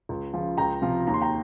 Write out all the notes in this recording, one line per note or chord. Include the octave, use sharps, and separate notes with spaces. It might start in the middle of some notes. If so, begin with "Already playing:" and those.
C#2
C#3 F3
C#2 G5 A#5
C3 F3
D#2 A#5
C6
G5 A#5